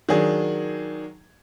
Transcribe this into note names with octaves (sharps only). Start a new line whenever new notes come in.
D#3 F#3 D4 G#4